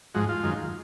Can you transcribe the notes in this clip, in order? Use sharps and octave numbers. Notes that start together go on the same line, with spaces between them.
G#2 F3 G#3 F#4
F4
F#2 D#3 G#3